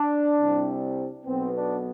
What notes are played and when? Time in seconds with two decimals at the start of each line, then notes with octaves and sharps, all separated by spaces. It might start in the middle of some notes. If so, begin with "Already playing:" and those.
Already playing: D4
0.39 C2 C3 G3 C4
1.26 B1 B2 B3 C4
1.55 D4